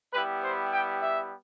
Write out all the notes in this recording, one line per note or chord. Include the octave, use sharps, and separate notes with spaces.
G3 B3 E4 G4 B4
C5
G5
E5